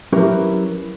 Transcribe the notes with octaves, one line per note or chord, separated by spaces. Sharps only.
F#3 C#4 E4 G4 A#4 B4